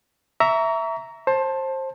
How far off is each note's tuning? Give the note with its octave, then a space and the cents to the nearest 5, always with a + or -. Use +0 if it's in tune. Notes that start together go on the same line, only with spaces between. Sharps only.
E5 +0 A#5 +0 C#6 +35
C5 +20 A5 +0